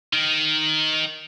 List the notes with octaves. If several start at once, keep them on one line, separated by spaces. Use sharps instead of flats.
D#3